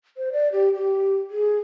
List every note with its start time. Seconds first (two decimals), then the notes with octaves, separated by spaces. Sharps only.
0.17 C5
0.32 D5
0.52 G4
0.75 G4
1.30 G#4